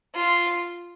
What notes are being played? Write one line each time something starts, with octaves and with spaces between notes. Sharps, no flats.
F4